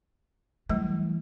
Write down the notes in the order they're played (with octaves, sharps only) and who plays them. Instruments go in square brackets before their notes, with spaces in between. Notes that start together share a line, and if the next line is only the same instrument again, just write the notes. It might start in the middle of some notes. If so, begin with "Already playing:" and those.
[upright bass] E3 [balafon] F#3 G3 A3